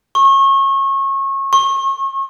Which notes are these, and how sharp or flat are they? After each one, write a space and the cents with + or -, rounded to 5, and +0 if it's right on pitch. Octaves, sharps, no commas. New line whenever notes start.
C#6 -25
C#6 -35